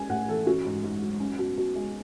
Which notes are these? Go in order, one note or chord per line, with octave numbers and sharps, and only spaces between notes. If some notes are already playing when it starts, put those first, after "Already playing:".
Already playing: G#3 C#4 G#5
A2 F#5
E3 A4
C#4 F#4
G#2
G#2
F#3
C#4
B2
B2
G#3